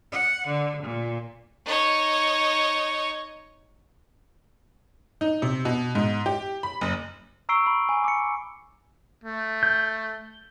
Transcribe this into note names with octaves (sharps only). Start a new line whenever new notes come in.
F#5
D3
A#2
D#4 C#5
D#4
C3
B2
G#2
G4
B5
F#1
A#5 C#6 E6 C7 D7 G7
B5
G#5
D6 C#7
A3
G6